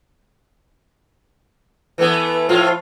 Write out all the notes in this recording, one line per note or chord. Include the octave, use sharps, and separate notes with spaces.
E3 A3 B3
A2 F3 F4